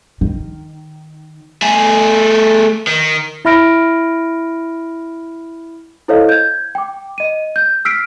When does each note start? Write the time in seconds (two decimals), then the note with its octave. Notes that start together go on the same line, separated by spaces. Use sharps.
0.21 D#3
1.62 A3 G#4
2.87 D#3
3.45 E4 E5 B5 F6 A#6 D7
6.08 E4 A4 C5 C#5 D#5 F5
6.29 G6 G#6
6.75 G5 D6
7.18 D#5 D#7
7.56 G6
7.85 E6 F6 B6 C7 D7